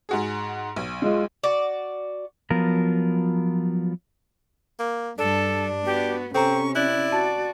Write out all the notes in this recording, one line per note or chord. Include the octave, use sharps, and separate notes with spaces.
G#2 F#4 G#4
B1
G#3 F4
F#4 D5
F3 F#3 B3 F4 A#4
A#3
G2 G3 D4 A4
B3 F#4 G4
C3 C4 C#4 A4 A#5 C#6
E4 D5 F#6 F#7
F#4 A5 A6